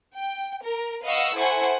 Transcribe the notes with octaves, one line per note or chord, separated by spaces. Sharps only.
G5
A#4
B4 D#5 F5 F#5 C#6 E6
E4 A4 C5 F#5 G#5 C#6